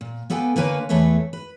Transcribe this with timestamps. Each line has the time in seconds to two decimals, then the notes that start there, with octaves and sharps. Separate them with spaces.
0.01 A#2
0.30 A#3 B3 A4 B4 G5 G#5
0.56 D3 A#3 A#4 B4 C#5 G#5
0.89 E2 E3 A3 B4 C#5 E5
1.33 B4